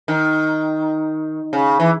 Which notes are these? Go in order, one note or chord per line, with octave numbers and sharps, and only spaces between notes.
D#3
C#3
E3